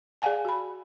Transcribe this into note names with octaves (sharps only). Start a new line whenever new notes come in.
G#4 D5 F5 F#5 G#5 A5
F#4 B5